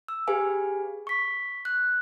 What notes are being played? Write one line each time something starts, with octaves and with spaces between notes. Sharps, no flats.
E6
G4 G#4 B4 F5 G#5
C#6 B6
F#6